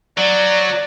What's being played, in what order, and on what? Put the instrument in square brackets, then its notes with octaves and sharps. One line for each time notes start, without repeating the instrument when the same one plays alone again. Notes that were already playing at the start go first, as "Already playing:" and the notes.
[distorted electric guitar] F#3 [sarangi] D5